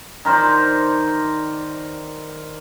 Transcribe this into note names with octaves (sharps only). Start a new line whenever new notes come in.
D#3 A#4 C5 D5